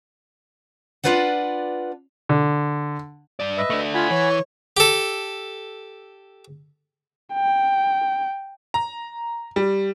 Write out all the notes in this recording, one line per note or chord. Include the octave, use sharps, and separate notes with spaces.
D4 E4 F4 B4 D5 F#5
D3
G2 D5
B4 D#5 E5
A3 D4
F4 F#5 G#5 B5
E3 C#5
G4 A4
G5
A#5
G3